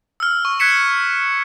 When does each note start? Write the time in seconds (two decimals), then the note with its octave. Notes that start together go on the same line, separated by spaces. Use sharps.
0.20 E6 F6
0.45 C#6
0.60 E6 F#6 G#6 B6 C#7 E7